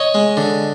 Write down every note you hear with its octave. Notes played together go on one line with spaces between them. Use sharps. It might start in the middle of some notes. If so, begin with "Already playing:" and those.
Already playing: C#5 D#5
G#3
D3